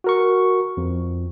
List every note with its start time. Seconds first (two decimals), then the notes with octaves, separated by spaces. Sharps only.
0.04 F#4 A#4 C#6
0.77 F2